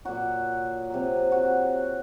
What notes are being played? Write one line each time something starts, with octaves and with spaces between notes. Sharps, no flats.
A#2 F#3 F#4
C3 F#3
F#4